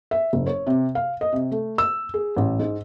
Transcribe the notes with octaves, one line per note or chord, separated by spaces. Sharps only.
E5
F#1
C#5
C3
F5
D#5
C3
A3
E6
G#4
A1
G#2